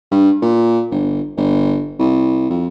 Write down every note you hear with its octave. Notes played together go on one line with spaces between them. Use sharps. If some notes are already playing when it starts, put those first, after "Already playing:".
G2
A#2
G1
G1
C2
F2